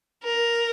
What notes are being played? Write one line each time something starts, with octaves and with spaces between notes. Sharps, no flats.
A#4